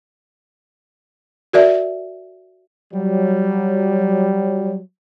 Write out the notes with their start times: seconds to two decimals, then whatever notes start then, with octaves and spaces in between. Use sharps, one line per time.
1.53 F#4 A#4 D5 E5
2.93 F#3 G3